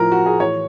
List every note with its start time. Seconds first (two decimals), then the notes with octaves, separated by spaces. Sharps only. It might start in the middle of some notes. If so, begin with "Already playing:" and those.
Already playing: A2 F3 A#4
0.12 F#4
0.26 G#4
0.39 A2 E3 C#5